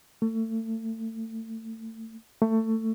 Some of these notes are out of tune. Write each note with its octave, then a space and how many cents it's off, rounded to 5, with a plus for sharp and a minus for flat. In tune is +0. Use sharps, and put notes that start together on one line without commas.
A3 +30
A3 +20